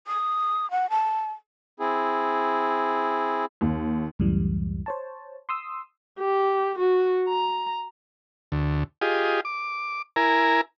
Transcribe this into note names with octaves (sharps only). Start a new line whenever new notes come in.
D#6
F#5
A5
C4 E4 G#4
D#2
C#2 F#2 A2 E3 G3
C5 C#5 A5
C6 D#6 E6
G4
F#4
A#5
D2
F4 G4 G#4 D#5
D6
E4 A#4 G#5 A#5